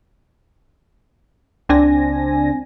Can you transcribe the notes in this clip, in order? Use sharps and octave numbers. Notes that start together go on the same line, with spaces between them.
C#2 C4 D4 G#5 A#6